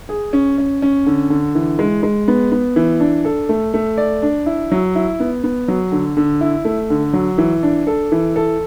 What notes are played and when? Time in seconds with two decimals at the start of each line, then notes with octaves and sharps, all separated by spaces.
0.09 G#4
0.33 C#4
0.58 C#4
0.82 C#4
1.06 D3
1.30 D3
1.55 E3
1.79 G#3
2.03 G#3
2.28 B3
2.52 B3
2.76 E3
3.00 D4
3.25 A4
3.49 A3
3.74 A3
3.98 D5
4.22 D4
4.46 E4
4.71 F#3
4.95 E4
5.20 B3
5.44 B3
5.68 F#3
5.92 D3
6.17 D3
6.41 E4
6.65 A3
6.90 D3
7.13 F#3
7.38 E3
7.63 D4
7.87 A4
8.12 E3
8.36 A4